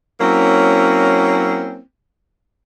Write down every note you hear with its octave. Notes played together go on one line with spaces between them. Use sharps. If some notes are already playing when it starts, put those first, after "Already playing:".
F#3 A#3 C4 C#4 E4